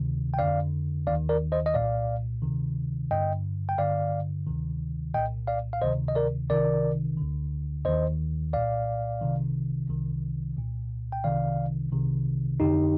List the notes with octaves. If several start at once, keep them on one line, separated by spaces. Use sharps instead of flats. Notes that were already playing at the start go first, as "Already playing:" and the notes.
Already playing: D2 C3 D#3
G5
F2 D3 D5 F5
D#2 D#3 D5 F5
A#4 D5
C5 D#5
D#5
C2 A#2 D5 F5
D2 C3 D#3
G2 D3 D#5 G5
G5
G2 D3 D5 F5
D2 C3 D#3
C2 A#2 D#5 G5
D5 F5
F5
D2 C3 D#3 C5 D#5
D#5
A#4 D5
C2 C3 D#3 A#4 D5
D2 D3
D#2 D#3 C5 D#5
C2 A#2 D5 F5
C2 C3 D#3
C2 C3 D#3
C2 A#2
G5
C2 C3 D#3 D5 F5
C2 C3 D#3
F2 D3 D#4 G4